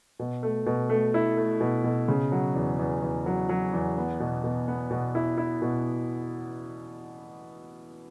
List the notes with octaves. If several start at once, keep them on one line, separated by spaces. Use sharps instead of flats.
B2
A3
B2
A3
E4
A3
B2
B2
C#3
F#3
E2
E2
E2
F#3
F#3
E2
B3
B2
B2
B3
B2
E4
E4
B2